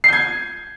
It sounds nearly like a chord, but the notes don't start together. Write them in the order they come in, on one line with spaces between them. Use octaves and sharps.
C7 G6 G#6